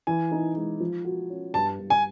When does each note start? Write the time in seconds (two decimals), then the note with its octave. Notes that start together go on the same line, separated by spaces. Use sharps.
0.07 E3 G#5
0.32 D#4
0.56 G#3
0.80 F3
1.05 F#4
1.30 C#4
1.54 G2 A5
1.79 G2
1.90 G#5